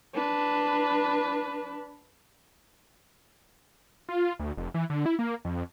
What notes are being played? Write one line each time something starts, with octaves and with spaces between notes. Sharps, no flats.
D4 B4
F4
D2
F1
E3
D3
E4
A#3
F2